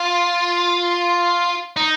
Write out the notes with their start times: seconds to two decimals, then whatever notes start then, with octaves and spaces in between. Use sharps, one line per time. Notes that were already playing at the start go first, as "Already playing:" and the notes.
Already playing: F4
1.77 D#4